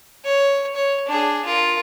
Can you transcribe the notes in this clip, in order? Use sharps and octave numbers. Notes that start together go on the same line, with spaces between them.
C#5
C#5
D4 G#4
F4 A#4